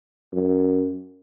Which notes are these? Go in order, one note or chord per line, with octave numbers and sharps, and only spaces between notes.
F#2